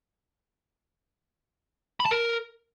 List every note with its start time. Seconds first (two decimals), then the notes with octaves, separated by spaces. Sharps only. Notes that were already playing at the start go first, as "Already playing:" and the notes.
2.00 B5
2.06 A5
2.11 A#4